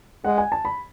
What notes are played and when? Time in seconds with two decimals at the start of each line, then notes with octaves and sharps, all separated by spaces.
0.25 G#3 F#5
0.38 G#5
0.52 A5
0.65 B5